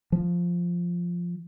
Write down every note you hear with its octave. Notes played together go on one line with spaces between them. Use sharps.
F3